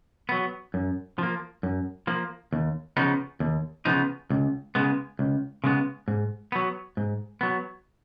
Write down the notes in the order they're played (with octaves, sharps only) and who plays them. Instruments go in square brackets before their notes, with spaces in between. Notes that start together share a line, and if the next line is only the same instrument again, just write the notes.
[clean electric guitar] F#3 B3
F#2
F3 A#3
F#2
F3 A#3
D#2
C#3 F3 B3 D#4
D#2
C#3 F3 B3 D#4
C#2
C#3 G#3 B3
C#2
C#3 G#3 B3
G#2
F#3 B3
G#2
F#3 B3